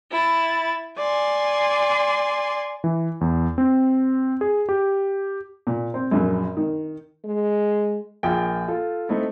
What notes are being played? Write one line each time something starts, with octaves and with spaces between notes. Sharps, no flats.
E4 A6
D5 G#5 C6
E3
E2
C4
G#4
G4
A#2
C4
A#1 F#2
D#3
G#3
A#1 A#3 F4 G#4 G5
F4 A4
A3 C4 D#4 E4